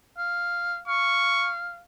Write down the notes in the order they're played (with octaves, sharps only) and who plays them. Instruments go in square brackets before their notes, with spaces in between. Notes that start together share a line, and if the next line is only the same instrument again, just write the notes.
[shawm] F5
[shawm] F5 [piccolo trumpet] C#6